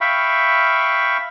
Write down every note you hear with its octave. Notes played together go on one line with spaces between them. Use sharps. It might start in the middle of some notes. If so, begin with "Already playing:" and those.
E5 F5 G5 B5 C#6